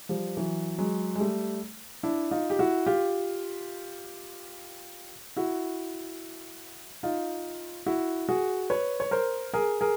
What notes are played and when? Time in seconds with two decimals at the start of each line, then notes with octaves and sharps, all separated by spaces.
0.09 F3 G3
0.37 E3 F#3
0.78 F#3 G#3
1.15 G#3
1.20 G3 A3
2.03 D4 E4
2.31 D#4 F4
2.50 G4
2.59 E4 F#4
2.86 F4 G4
5.36 E4 F#4
7.03 D#4 F4
7.86 E4 F#4
8.29 F#4 G#4
8.70 B4 C#5
9.00 C#5
9.11 A#4 C5
9.53 G#4 A#4
9.81 G#4 A#4